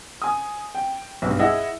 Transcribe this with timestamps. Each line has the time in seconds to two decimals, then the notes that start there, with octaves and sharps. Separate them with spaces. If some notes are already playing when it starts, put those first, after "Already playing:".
0.22 G#5 D#6
0.75 G5
1.22 B1 G2
1.39 E4 G#4 D#5 E5 F#5